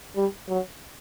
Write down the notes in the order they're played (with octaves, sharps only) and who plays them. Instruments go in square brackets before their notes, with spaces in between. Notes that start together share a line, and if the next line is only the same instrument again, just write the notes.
[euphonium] G3
F#3